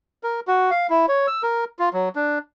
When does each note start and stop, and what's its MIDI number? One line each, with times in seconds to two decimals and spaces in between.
0.23 0.40 70
0.48 0.70 66
0.71 0.87 77
0.90 1.06 64
1.08 1.27 73
1.27 1.43 88
1.43 1.65 70
1.79 1.89 65
1.93 2.09 54
2.15 2.38 62